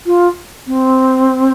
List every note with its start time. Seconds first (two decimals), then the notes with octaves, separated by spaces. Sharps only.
0.06 F4
0.67 C4